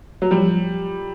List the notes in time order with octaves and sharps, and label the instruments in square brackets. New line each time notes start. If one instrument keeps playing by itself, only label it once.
[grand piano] F#3
[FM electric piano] F3 [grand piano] G3